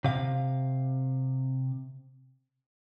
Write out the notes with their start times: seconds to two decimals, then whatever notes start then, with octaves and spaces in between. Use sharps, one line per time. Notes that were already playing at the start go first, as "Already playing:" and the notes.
0.04 C3 F5